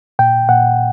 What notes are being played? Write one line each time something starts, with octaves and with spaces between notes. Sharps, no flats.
A#2 G5
A#2 F#5